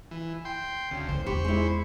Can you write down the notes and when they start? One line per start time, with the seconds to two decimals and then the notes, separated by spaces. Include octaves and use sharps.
0.11 E3
0.45 G5 C6
0.91 D2 C#3
1.09 E2 E3 C5
1.26 E2 F4 G4 C5 B5 C#6
1.44 G#3 E4